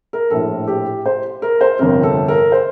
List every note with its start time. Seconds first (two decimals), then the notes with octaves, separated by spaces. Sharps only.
0.13 A#4
0.30 A#1 A2 A4
0.67 G4
1.06 C5
1.42 A#4
1.61 C5
1.79 G1 F2 C3 A#4
2.03 A4
2.28 A#4
2.52 C5